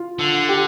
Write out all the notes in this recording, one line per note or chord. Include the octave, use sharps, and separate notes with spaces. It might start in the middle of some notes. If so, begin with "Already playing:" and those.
Already playing: F4
D3
G4